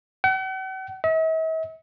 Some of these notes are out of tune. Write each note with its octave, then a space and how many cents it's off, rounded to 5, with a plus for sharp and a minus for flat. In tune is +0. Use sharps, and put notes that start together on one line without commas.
F#5 +45
E5 -45